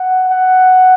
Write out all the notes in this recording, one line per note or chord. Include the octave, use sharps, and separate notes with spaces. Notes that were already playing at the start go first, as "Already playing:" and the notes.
Already playing: F#5
F#5